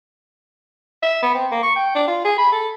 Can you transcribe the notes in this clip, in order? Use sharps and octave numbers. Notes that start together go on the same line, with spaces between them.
E5
B3
C4
A#3
C#6
G5
D4
F4
G#4
B5
A4